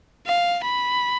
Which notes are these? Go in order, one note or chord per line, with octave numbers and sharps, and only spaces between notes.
F5
B5